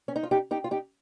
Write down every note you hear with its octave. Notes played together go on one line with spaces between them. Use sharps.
C#4
D#4
F4
D#4 G4
D#4 G4
F4
D#4 G4